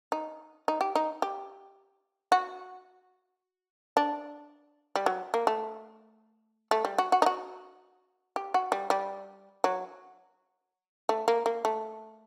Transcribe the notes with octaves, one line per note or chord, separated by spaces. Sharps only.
D#4
D#4
G4
D#4
G4
F#4
D4
G3
F#3
A#3
A3
A3
G3
F#4
F#4
D#4
F#4
G4
F#4
G3
G3
F#3
A3
A#3
A#3
A3